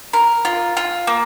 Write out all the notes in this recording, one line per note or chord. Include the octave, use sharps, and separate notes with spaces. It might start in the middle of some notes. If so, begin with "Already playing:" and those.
A#4
F4
F4
A#3